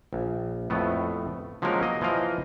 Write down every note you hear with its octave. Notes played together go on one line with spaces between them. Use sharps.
A#1
F2 A2 A3 B3
F3 F#3 G#3 A#3 C#4 A#4
A#3 D#5
E3 F3 A#4 D#5 F5